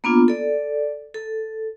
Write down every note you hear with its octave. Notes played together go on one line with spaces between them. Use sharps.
A#3 B3 D4 F4
A4 D5
A4